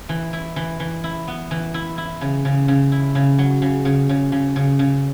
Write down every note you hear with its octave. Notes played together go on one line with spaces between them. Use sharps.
E3
E4
E3
E3
E4
B3
E3
E4
E4
C#3
C#3
C#3
E4
C#3
F#3
C#3
C#3
C#3
C#3
C#3
C#3